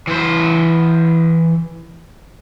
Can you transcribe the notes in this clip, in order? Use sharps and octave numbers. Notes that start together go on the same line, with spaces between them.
E3 C5